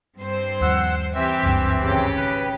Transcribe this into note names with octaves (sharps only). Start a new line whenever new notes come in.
G2 C4 C5
D#2 F3 F#5 E6
E3 C4 G4 E5
F#1 C#2 G2
G#1 C#3 G4
B4